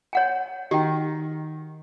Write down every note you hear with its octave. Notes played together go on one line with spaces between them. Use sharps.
C#5 F#5 G#5
D#3 G4 G5